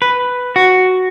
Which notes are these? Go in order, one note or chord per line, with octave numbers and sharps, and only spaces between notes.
B4
F#4